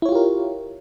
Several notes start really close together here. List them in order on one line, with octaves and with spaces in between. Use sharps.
E4 C#5 F4 G4 A#4